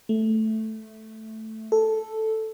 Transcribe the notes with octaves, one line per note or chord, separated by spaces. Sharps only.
A3
A4